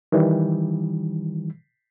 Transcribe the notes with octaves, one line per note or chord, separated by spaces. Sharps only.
D#3 E3 G3